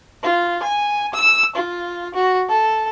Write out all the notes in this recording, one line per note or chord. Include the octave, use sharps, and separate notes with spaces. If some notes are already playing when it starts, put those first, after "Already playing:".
F4
G#5
E6
F4
F#4
A4